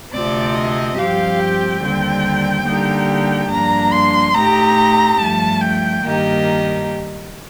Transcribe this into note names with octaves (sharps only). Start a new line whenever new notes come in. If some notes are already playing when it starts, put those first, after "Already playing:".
D2 C3 F3 C4 D5
D#5
G2 F3 C4 G4 F5
G5
D#2 D3 G3 C4
D3 G3 A#3 D#4 G4
G2 F3 A#3 D4 A#5
C6
A2 A3 C4 D#4 G4 A#5
G2 F3 A3 A5
G5
G2 D#3 A#3 D#4 G4